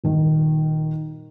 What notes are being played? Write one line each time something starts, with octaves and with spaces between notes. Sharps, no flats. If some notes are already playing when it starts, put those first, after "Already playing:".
D#1 D#3